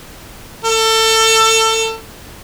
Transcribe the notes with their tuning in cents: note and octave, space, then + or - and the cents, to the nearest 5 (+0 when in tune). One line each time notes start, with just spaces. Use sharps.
A4 +25